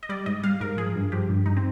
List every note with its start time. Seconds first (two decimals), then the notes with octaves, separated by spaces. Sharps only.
0.03 D#5
0.09 G3 D5
0.26 G#2 D#5
0.44 G3 F5
0.61 G#2 A#4
0.77 F3 G#4
0.95 G2
1.12 F3 G4
1.30 G2
1.46 G2 D#4
1.57 C4